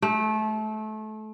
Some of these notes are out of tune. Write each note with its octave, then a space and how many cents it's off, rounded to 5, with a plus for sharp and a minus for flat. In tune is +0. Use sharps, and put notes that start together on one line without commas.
A3 -25